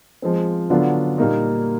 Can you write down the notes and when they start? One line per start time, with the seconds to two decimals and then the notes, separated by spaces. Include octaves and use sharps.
0.22 F3 G#3 C4
0.70 D3 F#3 B3 D4 F4
1.18 A#2 G3 A#3 D#4